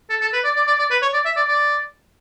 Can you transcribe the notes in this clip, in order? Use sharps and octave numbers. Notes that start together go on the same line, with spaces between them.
A4
A4
B4
D5
D5
D5
D5
B4
C#5
D5
E5
D5
D5